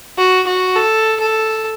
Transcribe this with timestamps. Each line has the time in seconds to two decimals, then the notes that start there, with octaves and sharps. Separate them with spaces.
0.18 F#4
0.47 F#4
0.76 A4
1.20 A4